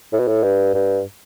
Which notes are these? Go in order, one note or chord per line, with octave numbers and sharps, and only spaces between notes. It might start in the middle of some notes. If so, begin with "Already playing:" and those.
A2
B2
A2
G2
G2